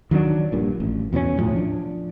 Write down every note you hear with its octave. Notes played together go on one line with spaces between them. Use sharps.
D#3 F#3 G#3 D4
A#1 G2 A#2
A1
E2 B2 E3 C#4
D2 A2 F3 F#3
F3 D4